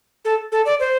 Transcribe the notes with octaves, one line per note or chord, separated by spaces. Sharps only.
A4
A4
D5
C5